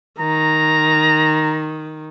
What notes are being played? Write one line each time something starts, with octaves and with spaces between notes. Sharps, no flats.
D#3 A#5